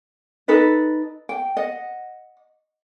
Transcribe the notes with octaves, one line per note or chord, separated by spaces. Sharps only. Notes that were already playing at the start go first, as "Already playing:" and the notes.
D#4 A4 B4 D#5
G5
D#5 F#5